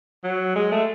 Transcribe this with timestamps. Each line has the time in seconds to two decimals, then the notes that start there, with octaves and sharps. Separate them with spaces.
0.24 F#3
0.56 G#3
0.72 A3